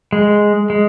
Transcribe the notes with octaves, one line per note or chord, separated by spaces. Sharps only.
G#3
G#3